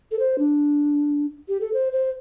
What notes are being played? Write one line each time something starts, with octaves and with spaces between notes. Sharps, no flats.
A4
C5
D4
G4
A4
C5
C5